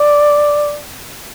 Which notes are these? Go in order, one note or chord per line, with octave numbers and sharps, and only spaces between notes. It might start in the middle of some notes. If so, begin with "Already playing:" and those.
Already playing: D5